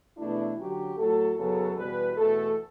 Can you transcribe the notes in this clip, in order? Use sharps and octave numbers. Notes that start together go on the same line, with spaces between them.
E2 B2 A3 D4 E4
D3 F#3 C#4 G4
A2 F#3 A3 A4
F#2 C#3 F#3 B3 A4
E2 B2 G3 B4
E2 B2 A3 A4